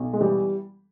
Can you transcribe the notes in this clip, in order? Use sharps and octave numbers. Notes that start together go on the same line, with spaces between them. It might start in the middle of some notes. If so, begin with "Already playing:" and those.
Already playing: B1
G#3
E3 G3